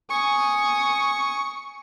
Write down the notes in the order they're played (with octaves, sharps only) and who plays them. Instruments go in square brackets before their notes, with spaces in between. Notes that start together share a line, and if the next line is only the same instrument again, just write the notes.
[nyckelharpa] G#5 D#6 [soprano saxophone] C#6